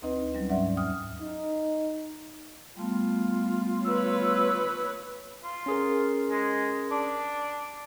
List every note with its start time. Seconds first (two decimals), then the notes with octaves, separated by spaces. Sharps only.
0.02 D2 C4 D#4 B4 D#5
0.34 F#3 G3 C#4
0.49 G#2 C#4 D5 E5 F#5
0.77 D#2 D#6 F6
1.22 D#4
2.76 G3 A3 B3 F4
3.85 B4 C#5 E6
5.44 F4
5.66 C#4 G#4 A#4
6.30 G#3
6.91 D4